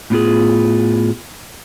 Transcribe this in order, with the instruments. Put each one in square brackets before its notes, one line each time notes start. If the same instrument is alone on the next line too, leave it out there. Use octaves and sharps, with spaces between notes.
[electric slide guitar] A2 B3 F4 G#4